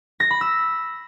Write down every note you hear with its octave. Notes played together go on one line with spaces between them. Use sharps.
A#6
B5
E6